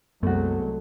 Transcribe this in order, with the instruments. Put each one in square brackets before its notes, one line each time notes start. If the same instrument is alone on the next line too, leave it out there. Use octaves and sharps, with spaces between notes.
[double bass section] C2 F#3 G#3 [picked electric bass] F#2 [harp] A3 F#4 [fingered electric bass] B3